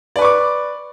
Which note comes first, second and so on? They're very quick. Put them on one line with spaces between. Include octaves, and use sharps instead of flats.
D5 B4 C#6 D6